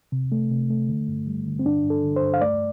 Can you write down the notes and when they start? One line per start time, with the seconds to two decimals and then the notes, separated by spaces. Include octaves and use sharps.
0.12 C3
0.32 A3
0.51 C3
0.70 A3
0.89 D3
1.08 G2
1.27 G3
1.46 D3
1.59 C4
1.65 G2 D4
1.84 G2
1.90 A4
2.04 D3
2.16 C5
2.22 G2
2.34 F5
2.41 A3 D5